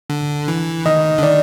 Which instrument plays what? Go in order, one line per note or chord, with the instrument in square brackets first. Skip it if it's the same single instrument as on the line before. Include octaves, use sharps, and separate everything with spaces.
[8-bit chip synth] D3
E3
[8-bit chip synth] D#3 [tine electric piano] D#5
[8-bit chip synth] D3
[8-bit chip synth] D#3 [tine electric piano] D5